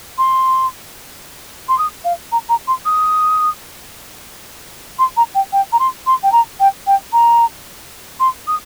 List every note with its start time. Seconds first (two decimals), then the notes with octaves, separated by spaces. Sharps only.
0.18 C6
1.68 C6
1.78 D#6
2.04 F5
2.32 A#5
2.49 A#5
2.67 C6
2.85 D#6
4.98 C6
5.16 A#5
5.34 G5
5.52 G5
5.72 A#5
5.79 C6
6.06 C6
6.23 G5
6.32 A#5
6.59 G5
6.87 G5
7.12 A#5
8.19 C6
8.47 D#6